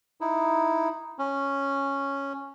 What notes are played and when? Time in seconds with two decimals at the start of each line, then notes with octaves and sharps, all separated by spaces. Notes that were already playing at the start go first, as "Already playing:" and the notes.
0.21 D#4 E4
1.19 C#4